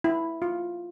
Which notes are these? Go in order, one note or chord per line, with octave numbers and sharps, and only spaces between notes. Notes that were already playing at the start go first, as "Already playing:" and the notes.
E4
F4